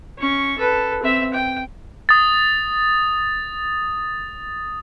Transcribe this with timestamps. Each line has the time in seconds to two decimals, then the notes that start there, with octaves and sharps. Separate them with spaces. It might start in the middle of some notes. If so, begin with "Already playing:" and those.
0.18 C#4 C#6
0.58 A4 B4
1.02 C4 E5
1.34 G5
2.09 D#6 A6